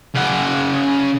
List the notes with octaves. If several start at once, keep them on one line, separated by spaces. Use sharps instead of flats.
C#3 F#5